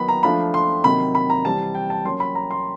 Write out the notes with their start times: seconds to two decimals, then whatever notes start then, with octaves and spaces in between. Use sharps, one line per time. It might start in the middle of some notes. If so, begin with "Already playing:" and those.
Already playing: D#3 F#3 B3 B5
0.08 A#5
0.23 F3 A3 D4 F4 B5
0.54 C6
0.84 C3 D#3 F#3 B5
1.15 B5
1.30 A#5
1.45 C3 E3 G3 C4 A5
1.75 G5
1.90 A5
2.05 F#3 A#3 C#4 C6
2.20 B5
2.35 A#5
2.51 C6